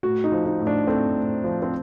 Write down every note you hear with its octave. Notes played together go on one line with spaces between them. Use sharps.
A2 F#4
D#4
F3
D#4
A2
D4
A3 C4
A2
F3
C4